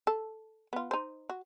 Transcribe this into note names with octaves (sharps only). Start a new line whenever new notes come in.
A4
B3 F4
D#4 C5
F#4